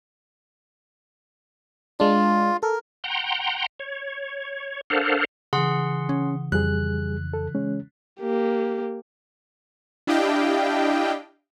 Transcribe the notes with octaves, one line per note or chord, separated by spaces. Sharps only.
G#3 D4 F4
A4 A#4
F#5 G5 A#5 C6
C#5
D4 A4 A#4 C5 F5 F#5
C#3 E3 G#4 F#5 C6
C#4
F2 G3 G#4 F#6
A4
G#3 C#4
A#3 G4
D4 E4 G4 D#5 F5 G5